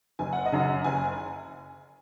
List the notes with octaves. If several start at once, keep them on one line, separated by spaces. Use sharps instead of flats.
F#1 G#5
F#5
D#5
F#2 C#3
F#5
F#1 G#5